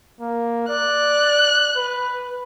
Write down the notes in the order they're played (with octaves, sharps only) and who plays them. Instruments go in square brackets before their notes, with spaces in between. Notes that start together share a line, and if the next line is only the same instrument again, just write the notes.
[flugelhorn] A#3
[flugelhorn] D5 [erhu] F#6
[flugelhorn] B4